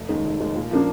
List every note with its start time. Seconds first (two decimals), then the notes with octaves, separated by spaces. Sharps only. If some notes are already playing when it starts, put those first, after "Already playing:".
Already playing: F1
0.09 D#2 D#3 G#3
0.24 F1
0.40 D#2 D#3 G#3
0.55 A#2
0.71 F3 A#3 D4